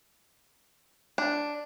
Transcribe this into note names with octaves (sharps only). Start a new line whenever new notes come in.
D4